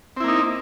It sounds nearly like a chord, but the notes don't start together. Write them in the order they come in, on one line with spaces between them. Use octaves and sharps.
C4 E4 A#3 D#4